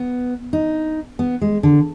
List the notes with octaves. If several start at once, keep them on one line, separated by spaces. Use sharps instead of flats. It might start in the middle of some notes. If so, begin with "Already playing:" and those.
Already playing: B3
D#4
B3
G#3
D3